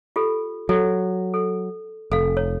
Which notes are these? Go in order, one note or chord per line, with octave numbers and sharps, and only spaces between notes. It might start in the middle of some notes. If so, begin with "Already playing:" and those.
F4 G4 A4
F#3 A4
A4
F1 A4 F5
C#5